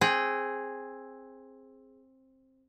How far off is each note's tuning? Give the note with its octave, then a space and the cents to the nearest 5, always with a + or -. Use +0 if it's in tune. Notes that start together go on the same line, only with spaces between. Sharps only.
C4 +15 G#4 +0 G5 -45